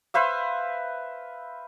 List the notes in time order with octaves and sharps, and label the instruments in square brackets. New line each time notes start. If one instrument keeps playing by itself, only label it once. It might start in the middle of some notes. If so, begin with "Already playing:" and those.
[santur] B4 C5 E5 F5